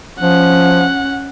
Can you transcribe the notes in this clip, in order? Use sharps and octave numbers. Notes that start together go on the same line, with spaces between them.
F3 C#4 F#5